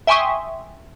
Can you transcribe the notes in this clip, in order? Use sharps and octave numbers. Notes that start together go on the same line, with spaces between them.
E5 G5 G#5 C6 C#6 D#6